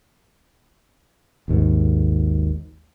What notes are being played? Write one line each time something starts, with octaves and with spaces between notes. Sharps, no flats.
G#1 D#2 G#2